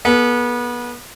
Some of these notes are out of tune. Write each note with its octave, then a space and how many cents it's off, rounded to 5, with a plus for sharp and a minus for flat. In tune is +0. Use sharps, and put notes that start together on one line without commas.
B3 -30 A4 -35